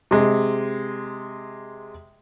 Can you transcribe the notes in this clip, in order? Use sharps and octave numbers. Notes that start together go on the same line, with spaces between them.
C3 G#3